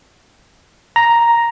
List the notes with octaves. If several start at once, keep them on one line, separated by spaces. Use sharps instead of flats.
A#5